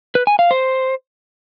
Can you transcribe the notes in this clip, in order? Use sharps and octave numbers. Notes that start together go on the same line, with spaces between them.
B4
G#5
F5
C5